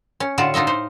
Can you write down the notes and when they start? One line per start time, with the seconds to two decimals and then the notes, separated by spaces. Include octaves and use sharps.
0.20 C#4
0.38 A2 D3 F4 F#4 A5
0.54 D4 D#4 F4 D#5 E5
0.67 D#4 C5